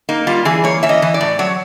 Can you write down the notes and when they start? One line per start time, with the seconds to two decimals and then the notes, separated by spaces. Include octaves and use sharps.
0.09 A#3 D#4
0.27 G3 F4
0.45 E3 G#4
0.64 A#3 C#5
0.83 E3 E5
0.89 D#5
1.02 E3
1.14 D5
1.21 A2
1.39 F#3 C#5